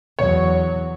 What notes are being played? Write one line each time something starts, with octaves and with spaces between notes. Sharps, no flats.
E2 F#3 C#5